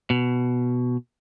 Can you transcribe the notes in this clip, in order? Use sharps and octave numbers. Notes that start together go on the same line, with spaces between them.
B2